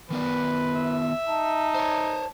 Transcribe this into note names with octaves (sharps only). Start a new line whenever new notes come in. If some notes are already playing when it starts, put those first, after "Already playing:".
D#3 B3 B4 D5
E5
D#4 A5
C5 C#5